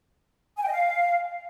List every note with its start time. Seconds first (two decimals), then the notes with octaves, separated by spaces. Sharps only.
0.57 G#5
0.62 G5
0.67 D#5
0.72 F5